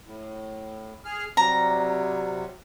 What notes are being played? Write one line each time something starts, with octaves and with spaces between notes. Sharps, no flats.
A2
G#4 F6
C3 F#3 G3 A#5